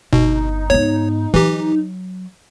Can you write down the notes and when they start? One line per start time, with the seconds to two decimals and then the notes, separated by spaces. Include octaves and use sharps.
0.13 G1 B2 D#4
0.70 G#2 B3 C#5
1.34 E3 F#3 G4